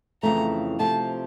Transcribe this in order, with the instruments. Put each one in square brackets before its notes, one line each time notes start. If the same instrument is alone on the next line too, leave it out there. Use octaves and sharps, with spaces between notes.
[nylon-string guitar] F2 C#3 E3 A3 C#4 [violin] A#5
[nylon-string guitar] C3 F3 A3 [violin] A5